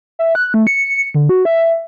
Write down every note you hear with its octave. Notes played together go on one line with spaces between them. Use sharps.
E5
F#6
A3
C#7
D3
F#4
E5